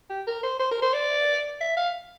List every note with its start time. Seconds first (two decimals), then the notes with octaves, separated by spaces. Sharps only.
0.10 G4
0.27 A#4
0.43 C5
0.59 C5
0.71 A#4
0.82 C5
0.93 D5
1.60 E5
1.77 F5